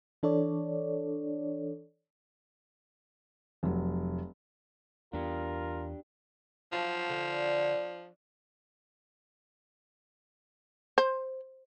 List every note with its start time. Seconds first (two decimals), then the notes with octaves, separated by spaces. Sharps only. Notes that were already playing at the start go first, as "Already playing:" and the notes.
0.23 E3 D4 A4 C#5 D5
3.63 F1 F#3
5.13 E2 B3 D4 F4 G4 A#4
6.72 F3 F#3 F5 A5
7.10 D3
10.98 C5